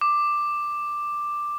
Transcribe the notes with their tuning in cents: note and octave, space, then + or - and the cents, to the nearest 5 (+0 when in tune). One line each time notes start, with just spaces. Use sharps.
D6 +10